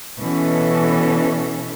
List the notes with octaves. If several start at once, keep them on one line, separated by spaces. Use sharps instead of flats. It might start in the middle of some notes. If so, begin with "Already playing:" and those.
B2 E3 C#4 A4